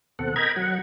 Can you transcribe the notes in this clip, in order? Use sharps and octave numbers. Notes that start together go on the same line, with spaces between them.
D#2 B2 C4 A4 F#5
A#4 D#5 G5 A#5 B5 G#6
F#3 F#5